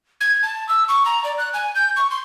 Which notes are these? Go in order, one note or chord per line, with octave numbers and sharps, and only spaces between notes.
G#6
A5
E6
C#6
A#5
D5
F#6
G#5
G6
C#6
C6